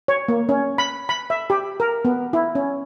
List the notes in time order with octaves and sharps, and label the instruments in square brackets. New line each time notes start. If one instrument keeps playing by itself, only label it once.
[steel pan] C#5
A#3
C#4
B5
B5
E5
G4
A#4
B3
E4
C#4